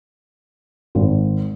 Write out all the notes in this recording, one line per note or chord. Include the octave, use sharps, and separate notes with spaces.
G#1